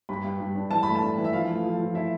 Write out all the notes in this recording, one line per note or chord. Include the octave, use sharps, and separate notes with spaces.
G2 B5
G2
G2
D4
E3 A5
A3 B5
A5
D4
E3
E5
F3 F5
A3
F3
F3
E4 E5